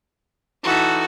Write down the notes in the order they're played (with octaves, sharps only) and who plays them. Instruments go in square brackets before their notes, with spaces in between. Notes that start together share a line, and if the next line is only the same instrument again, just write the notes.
[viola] E3 D#4 [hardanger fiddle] F#4 A4